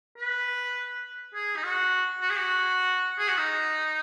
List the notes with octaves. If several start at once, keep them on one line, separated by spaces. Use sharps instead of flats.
B4
G#4
D#4
F#4
F#4
G#4
F#4
G#4
F#4
D#4